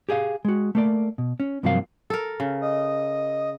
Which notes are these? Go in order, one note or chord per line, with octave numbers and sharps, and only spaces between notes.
G4 G#4 D#5 F5
G#3 F#4
A3 A#3 D5
B2
C#4
G2 C3 F3 F#3 A#3 F5
A4 A#4
C#3
D#5